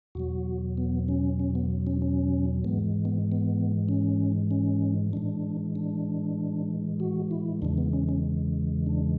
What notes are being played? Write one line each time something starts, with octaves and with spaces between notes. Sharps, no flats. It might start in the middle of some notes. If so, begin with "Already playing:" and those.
E2 B2 F#3 F#4
B3
C#4
C#4
B3
C#4
C#4
G#2 E3 G#3 B3
B3
B3
C#4
C#4
A2 E3 G#3 D4
D4
F#4
E4
E2 C#3 E3 G#3 D4
B3
C#4
C#4
D4